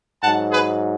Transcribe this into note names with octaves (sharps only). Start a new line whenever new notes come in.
G#2 F#3 F#5 A5
G#4 B4